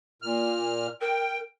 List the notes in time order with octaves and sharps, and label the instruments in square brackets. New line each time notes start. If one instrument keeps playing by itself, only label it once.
[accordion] A#2 F6
[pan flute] A#4 [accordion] G5